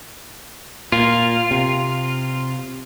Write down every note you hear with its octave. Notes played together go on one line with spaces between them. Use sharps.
A#2 F4
C3